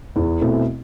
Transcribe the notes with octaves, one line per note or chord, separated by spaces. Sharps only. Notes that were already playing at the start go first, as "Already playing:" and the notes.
E2
B2 A3 C4 E4